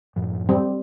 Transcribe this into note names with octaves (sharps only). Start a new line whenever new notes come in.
F#2 A2 F3
G3 C4